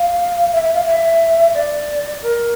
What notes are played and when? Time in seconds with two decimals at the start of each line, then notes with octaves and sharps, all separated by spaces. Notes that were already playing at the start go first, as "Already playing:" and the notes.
Already playing: F5
0.52 E5
0.64 E5
0.74 F5
0.86 E5
1.54 D5
2.22 A#4